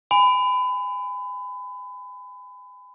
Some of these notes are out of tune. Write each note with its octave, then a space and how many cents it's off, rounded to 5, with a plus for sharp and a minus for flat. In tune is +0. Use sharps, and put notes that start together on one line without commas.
G#5 -20 B5 +30